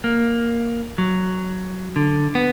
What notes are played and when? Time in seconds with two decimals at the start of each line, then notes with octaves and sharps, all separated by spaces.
0.04 A#3
0.98 F#3
1.96 D3
2.35 B3